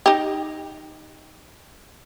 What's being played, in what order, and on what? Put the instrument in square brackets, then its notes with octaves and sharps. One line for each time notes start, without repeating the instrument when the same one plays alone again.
[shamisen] D#4 G4